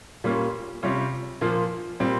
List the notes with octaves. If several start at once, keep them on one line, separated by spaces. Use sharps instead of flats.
A#2 G3 A#3 C#4 F4
C3 G3 C#4 F4
A#2 F3 A#3 F4
A#2 G3 C4